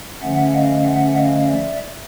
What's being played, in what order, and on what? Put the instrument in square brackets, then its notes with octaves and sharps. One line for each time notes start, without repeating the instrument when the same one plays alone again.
[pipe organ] D3 F3 A3 C#4 E5 F#5
D#5 F5
E5 F#5
D#5 F5
D5 E5